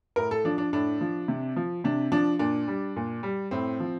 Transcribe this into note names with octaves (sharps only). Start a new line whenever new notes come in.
A2 A#4
A4
F3 D4
D4
A2 D4
F3
C3
F3
C3 D4
F3 D4
A#2 D4
G3
A#2
G3
A2 C4
F3